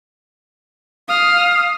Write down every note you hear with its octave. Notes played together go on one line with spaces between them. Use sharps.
F5 D#6 F6